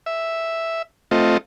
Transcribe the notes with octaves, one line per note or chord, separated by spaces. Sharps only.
E5
A3 C4 F4 D#5